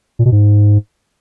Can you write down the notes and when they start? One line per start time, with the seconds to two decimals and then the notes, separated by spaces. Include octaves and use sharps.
0.19 A#2
0.26 B2
0.32 G#2